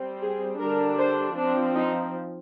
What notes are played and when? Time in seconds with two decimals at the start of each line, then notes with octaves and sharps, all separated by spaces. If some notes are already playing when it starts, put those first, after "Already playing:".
Already playing: G3 C4
0.22 G#4
0.60 D3 G3 D4 A#4
0.98 C5
1.37 F3 C4 D4
1.75 D#4